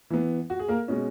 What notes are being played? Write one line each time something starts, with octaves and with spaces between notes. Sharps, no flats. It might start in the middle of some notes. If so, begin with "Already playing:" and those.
E3 B3
F#4
G#4
A#3 A#4
B2 G#3 C#4